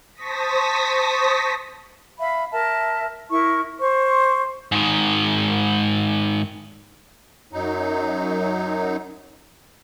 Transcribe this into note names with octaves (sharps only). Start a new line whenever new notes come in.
C5 A5 C#6 D#6 A#6 B6
E5 F5 B5
A#4 E5 A5
E4 A#4 C#6
C5 C#6
G#2 D#3
F#2 F#3 D#4